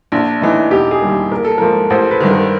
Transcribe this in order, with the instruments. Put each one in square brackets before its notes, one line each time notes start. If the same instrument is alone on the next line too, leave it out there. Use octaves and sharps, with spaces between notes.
[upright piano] A#1 [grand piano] D4
[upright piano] A2 E3 [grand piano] D#4
[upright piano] E1 [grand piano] G4
[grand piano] G#4
[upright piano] D#2 D#3 G3 A#3
[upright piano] A#1 [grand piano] A#4
[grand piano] A4
[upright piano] G#2 F3 A#3 [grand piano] A#4
[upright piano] A1 [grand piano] C5
[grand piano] B4
[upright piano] G2 D#3
[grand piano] A#4